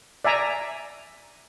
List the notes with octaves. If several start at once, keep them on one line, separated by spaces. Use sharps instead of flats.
D5 E5 G#5 A#5